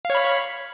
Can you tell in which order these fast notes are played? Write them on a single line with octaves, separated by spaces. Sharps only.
F5 C#5 B5